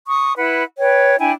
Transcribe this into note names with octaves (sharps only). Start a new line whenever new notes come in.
C#6 D#6
E4 B4 F#5
B4 C#5 G5
D4 E4 G5 G#5